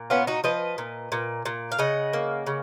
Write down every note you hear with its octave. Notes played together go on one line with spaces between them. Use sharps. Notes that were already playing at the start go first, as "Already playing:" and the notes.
Already playing: A#2
B3 C#4 F4
D#4 F#4
F3 B4 D#5
A#2
A#2
A#2
F5
C#3 D#5 F#5
A#3
C#3